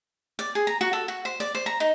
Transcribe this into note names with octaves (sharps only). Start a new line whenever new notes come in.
D5
G#4
A#5
F#4
A4
F#4
C5
D5
C5
A#5
D#4